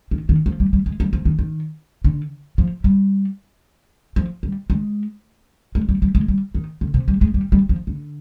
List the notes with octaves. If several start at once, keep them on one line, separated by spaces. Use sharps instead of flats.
D#3
D#3
F3
G3
G3
G#3
G3
F3
D#3
D#3
D3
F3
G3
F3
G3
G#3
G#3
G3
G3
G#3
G3
D#3
D3
C3
G3
G#3
G3
G3
F3
D3